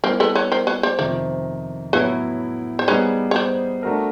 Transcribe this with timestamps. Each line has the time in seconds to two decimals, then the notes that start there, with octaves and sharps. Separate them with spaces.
0.04 G3 B3 E4 A#4 C5
0.20 A4 B4
0.35 B4 C#5
0.52 A#4 C5
0.67 B4 C#5
0.83 C5 D5
0.99 F2 C3 D#3 C5 D5
1.93 A2 F#3 B3 E4 B4 C#5
2.79 C5
2.88 G3 B3 D#4 G#4 B4 C#5
3.31 C#5
3.36 C5 D5
3.83 A3 D4 F#4 A#4